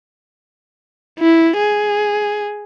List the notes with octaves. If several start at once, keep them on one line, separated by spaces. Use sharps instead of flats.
E4
G#4